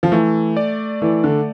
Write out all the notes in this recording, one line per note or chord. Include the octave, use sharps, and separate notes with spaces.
F3
E3 A3
D5
E3 A3
D3